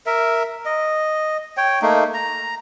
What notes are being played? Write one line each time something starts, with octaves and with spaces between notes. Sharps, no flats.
A#4 E5
D#5
C#5 G5
A3 A#3 D#4
A#5